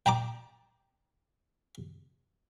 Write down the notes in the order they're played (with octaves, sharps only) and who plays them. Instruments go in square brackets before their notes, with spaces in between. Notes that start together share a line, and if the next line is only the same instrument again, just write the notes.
[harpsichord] G5 A5 A#5 D6